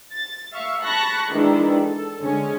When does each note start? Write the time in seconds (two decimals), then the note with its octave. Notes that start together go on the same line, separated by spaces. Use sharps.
0.12 A6
0.53 E5 F5 C#6
0.83 A5 B5 C#6 F#6 A#6
1.31 D#3 E3 G#3 D4 E4
1.82 A4
2.21 D3 G#3 C#4